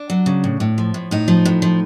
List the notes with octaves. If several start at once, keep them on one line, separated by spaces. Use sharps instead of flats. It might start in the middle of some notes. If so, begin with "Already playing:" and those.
Already playing: D4
F#3
C#3
A2
A2
F3
A2
A2 D#4
F3
A2
F3